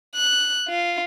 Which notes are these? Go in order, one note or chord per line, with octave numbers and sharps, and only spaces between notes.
F#6
F4